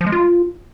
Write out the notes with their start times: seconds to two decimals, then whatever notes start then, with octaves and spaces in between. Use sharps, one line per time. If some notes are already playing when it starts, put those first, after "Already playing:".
0.01 F3
0.07 G#3
0.12 F4